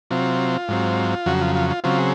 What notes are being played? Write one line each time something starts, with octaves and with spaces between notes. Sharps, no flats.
C3 F#3 C4 F4
G#2 F#3 C4
F2 C#3 F#3 F#4
F4
F4
F4
C#3 F#3 C4 F4
G#4